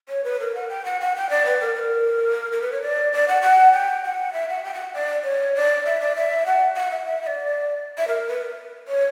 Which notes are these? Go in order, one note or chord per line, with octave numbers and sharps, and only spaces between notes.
C#5
B4
A#4
F#5
G5
F#5
F#5
G5
D5
B4
A#4
B4
A#4
A#4
B4
C#5
D5
D5
F#5
F#5
G5
F#5
E5
F#5
G5
F#5
D5
C#5
D5
E5
D5
E5
F#5
F#5
E5
E5
E5
D5
E5
A#4
B4
C#5